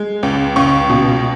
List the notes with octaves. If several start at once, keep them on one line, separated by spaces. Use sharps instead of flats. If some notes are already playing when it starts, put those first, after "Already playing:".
Already playing: G#3
C#2
C#2 C#6
B2